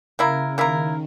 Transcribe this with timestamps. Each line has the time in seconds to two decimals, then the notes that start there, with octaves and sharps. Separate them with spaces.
0.18 C#3 A#3 E4 A#4
0.58 D#3 A#3 E4 A#4